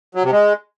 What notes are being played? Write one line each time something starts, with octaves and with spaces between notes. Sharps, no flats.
F#3
C3
G#3